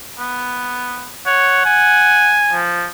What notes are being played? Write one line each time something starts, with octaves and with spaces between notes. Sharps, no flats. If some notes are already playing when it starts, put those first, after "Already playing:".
B3
C#5 F#5
G#5
F3